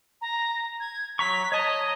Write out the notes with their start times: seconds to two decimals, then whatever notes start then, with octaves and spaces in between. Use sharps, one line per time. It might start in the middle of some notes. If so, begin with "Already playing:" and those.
0.21 A#5
0.80 G#6
1.19 F#3 A#5 C#6 B6
1.52 C#5 D#5 A5 A#5